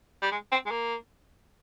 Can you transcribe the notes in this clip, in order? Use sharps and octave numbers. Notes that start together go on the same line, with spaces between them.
G3
G#3
C4
G#3
A#3